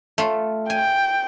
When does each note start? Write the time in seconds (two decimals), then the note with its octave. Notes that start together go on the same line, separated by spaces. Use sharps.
0.18 A3 F4
0.70 G5 G#5